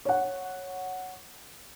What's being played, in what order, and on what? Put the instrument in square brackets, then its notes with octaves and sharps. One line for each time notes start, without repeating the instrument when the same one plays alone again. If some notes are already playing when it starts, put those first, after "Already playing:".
[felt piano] C#5 F#5